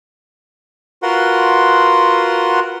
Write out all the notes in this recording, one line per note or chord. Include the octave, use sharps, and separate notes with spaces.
F4 F#4 A#4 B4 F#5 C6